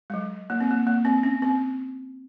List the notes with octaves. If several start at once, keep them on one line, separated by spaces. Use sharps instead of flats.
G#3
F#3
A#3
C4
A#3
A#3
C4
C#4
C4